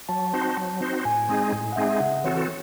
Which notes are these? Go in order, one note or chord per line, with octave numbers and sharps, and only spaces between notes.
F#3 A5
C4 D#4 F#4 C5
F#3
C4 D#4 F#4 C5
A2 G#5
G#3 C4 D#4 G#4
A2
F#5
G#3 C4 D#4 G#4 E5
C#3 F#5
E3 C4 F#4 A4 C#5